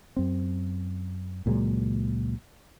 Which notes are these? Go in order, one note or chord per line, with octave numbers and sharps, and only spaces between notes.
F#2 C4
C#2 A#2 F#3 G#3